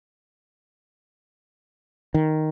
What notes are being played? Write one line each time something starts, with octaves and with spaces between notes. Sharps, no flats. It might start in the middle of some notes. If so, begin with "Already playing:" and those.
D#3